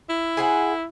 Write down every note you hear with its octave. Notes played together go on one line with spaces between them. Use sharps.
E4
G#4 C5 F#5